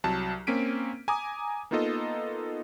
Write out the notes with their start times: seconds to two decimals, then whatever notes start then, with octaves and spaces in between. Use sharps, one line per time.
0.04 C2 F#3 A5
0.47 A#3 C4 C#4 B6 D7 D#7
1.08 G#5 A#5 D6 D#6
1.71 A#3 B3 D#4 F4 A4 D#5